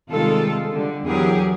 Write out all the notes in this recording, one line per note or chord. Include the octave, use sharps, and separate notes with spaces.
C3 D#3 G3 G#3 F4 A4
D3 G3
E2 E3 F#3 G4 G#4 A#4